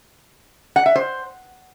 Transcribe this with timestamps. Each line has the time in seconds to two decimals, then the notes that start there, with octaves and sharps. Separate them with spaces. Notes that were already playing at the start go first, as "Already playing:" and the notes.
0.76 F#5
0.86 E5
0.96 C5